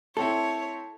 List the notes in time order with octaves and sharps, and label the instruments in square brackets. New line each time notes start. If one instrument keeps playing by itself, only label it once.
[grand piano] A3 C4 E4 [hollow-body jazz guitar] A4 [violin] C#5